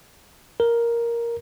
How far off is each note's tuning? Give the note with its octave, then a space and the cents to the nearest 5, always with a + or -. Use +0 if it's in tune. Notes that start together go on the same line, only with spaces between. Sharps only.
A#4 +5